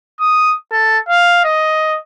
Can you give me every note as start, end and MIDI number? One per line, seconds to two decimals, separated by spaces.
0.20 0.55 87
0.72 0.98 69
1.08 1.44 77
1.44 1.98 75